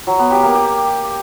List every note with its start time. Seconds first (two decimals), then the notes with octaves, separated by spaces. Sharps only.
0.07 F#3
0.19 B3
0.31 G4
0.43 A#3
0.55 G4